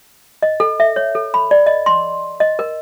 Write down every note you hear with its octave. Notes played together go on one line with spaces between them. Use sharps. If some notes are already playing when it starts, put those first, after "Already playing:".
D#5
A4
E5
C#5
A4
B5
D5
D#5
C6
D#5
A#4